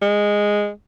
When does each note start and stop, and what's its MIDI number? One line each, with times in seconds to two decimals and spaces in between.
0.02 0.69 56